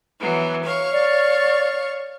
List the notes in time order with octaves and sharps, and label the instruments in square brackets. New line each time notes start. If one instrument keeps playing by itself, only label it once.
[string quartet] E3 F#3 B3
C#5 F5 C#6
[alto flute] D5